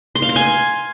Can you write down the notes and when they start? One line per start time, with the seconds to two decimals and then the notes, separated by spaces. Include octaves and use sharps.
0.15 C6
0.22 F5
0.29 C6
0.36 G#5